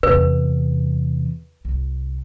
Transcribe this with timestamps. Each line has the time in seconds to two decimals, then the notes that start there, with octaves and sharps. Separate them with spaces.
0.03 E2 C3 B4
1.65 C2